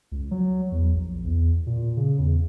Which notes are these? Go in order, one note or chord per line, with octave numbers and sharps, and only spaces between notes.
C#2
F#3
E2
A#1
E2
A#2
C#3
E2